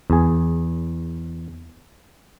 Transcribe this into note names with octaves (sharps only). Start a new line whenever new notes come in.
E2 G#4